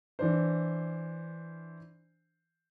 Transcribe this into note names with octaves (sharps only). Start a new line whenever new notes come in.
E3 D4 C5